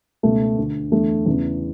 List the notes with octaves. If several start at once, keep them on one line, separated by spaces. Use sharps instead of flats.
C#2 B2 A3
D2 D3
E2 D3 A3
E2 C#3 E3